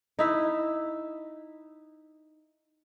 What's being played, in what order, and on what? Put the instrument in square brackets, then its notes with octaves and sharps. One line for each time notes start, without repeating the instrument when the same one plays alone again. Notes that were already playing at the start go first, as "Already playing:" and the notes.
[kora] D#4 E4 E5